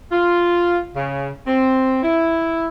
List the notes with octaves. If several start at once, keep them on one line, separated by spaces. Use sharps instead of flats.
F4
C#3
C4
E4